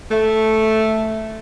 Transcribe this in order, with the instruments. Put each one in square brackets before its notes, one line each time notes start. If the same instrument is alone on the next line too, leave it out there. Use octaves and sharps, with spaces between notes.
[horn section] A3